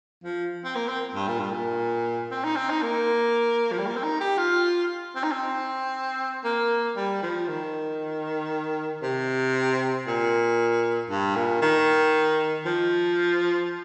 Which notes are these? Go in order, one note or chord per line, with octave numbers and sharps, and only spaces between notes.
F3
C4
A#3
C4
G2
A#2
G2
A#2
C4
D#4
C4
D#4
A#3
F3
G3
A#3
C4
D#4
G4
F4
C4
D#4
C4
A#3
G3
F3
D#3
C3
A#2
G2
A#2
D#3
F3